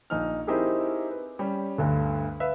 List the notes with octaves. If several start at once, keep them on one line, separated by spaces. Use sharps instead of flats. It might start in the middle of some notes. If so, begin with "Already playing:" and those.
A#1 D#4 F6
C4 D#4 E4 G4 G#4 A#4
B4
G3 C#4
D2 G2 D3
B4 E5 F5